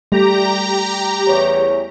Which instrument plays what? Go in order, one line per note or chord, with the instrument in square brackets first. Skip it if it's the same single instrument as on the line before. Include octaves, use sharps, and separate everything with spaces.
[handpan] G3 A3 [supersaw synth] G4 A#5
[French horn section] E2 C#5